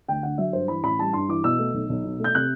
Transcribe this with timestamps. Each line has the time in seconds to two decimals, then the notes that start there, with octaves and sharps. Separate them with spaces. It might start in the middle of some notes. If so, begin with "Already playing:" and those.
0.08 D2 G5
0.23 D3 F#5
0.38 F#3 E5
0.53 G2 C5
0.68 E3 B5
0.83 A1 B5
0.99 G3 A5
1.13 G2 C6
1.29 E3 D6
1.44 B2 E6
1.59 A3
1.74 B1
1.89 B1
2.04 B2
2.20 A3 G6
2.35 C3 F#6